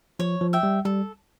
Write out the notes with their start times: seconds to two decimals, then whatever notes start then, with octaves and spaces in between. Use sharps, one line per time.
0.19 F3 C#5
0.41 F3
0.53 E5 G5
0.63 G3
0.85 G3 A4